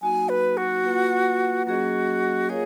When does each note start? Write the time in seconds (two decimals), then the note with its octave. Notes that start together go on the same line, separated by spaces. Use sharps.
0.01 F#3 A#3 D#4 F#4 G#5
0.29 B4
0.57 F#4
0.84 A#3 F4 B4 F#5
1.66 F#3 A#3 C#4 F#4 G#4 D#5
2.49 A#3 F4 G#4 A#4 C#5 F5